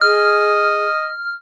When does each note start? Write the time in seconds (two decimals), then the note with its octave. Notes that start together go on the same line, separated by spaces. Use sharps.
0.01 G#4 D#5 F6